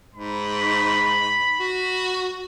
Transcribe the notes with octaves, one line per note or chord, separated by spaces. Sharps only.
G#2 B5
F#4